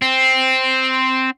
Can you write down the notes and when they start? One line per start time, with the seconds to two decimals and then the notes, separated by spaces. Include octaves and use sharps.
0.02 C4